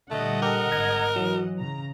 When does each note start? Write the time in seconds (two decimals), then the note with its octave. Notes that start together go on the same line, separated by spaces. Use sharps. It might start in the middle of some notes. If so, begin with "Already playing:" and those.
0.10 A#2 D3 G3 A3 D#5 F#5
0.42 G4 A4 A#4
0.72 G#1 A#5 G#6
1.16 E3 F#3
1.59 C#3 A#5